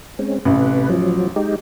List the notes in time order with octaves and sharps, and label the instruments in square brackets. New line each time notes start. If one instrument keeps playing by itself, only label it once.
[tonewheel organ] G#3 C4 C#4
[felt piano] A1 [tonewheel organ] C3 B4
[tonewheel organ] F3 F#3
G#3 D#4 G4